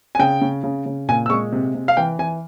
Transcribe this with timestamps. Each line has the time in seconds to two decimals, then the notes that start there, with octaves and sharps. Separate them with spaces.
0.15 G#5
0.19 C#3 G5
0.42 C#3
0.64 C#3
0.86 C#3
1.09 A#2 G#5
1.26 E6
1.30 G#3 C#6
1.52 C3
1.75 C3
1.88 F5
1.97 E3 G5
2.19 E3 G#5